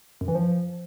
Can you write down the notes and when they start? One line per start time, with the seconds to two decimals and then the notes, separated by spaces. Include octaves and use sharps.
0.21 F#2
0.28 E3
0.35 F3